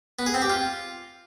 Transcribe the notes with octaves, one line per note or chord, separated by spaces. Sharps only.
B3
G#4
C4
G4
F4